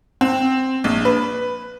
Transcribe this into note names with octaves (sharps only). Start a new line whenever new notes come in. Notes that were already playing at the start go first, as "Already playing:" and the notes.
C4
A#1
B4